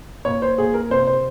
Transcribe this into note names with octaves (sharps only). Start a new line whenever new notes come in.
A#2 C#5
C5
A#2 G#4
A#4
C3 C5
C5